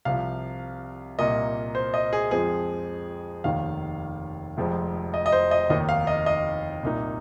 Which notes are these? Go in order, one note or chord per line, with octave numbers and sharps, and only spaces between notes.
C2 C3 F3 F5
C2 A#2 A#3 D#5
C5
D#5
G#4
F2 F3 G#3 C4 G#4
F1 D#2 D#3 F5
F1 F2 F3 G#3 C4
D#5
D#5
C5
D#5
F1 D#2 D#3 A#3 D#4 D#5
F5
D#5
D#5
C2 A#2 A#3 D#4